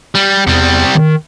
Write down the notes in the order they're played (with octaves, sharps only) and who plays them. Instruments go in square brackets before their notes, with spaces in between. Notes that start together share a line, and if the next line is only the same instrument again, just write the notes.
[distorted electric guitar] G3
[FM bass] E2 [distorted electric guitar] C3 G3
[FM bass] D#3